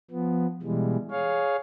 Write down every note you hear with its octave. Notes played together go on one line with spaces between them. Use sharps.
F3 B3
B2 E3 G3 G#3
G#4 C#5 F5